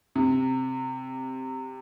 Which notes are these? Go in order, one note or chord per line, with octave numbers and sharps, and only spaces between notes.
C3